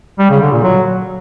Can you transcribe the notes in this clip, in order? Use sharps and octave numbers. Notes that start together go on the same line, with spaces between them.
G3
C#3
D3
A#2
F#3